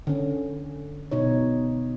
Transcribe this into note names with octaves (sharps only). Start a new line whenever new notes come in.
D3 C#4
B2 D#4 C#5